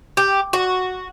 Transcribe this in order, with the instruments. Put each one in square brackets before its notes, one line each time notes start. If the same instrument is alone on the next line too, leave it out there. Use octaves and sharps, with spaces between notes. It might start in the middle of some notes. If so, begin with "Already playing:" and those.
[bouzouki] G4
F#4